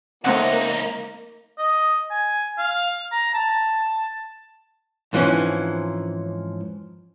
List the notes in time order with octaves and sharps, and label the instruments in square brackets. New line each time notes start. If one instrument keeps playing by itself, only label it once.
[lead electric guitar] C#2 D#4 [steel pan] A3 C4 F#5 [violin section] A#3
[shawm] D#5
G#5
F5
A#5
A5
[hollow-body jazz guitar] F2 G#2 E3 F3 C#4